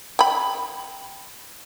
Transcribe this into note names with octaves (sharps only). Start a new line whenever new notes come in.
G5 B5